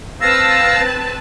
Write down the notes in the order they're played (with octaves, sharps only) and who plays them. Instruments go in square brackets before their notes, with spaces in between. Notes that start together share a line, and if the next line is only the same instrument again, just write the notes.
[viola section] C4 B4 A5 [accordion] F5 E6 [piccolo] A#6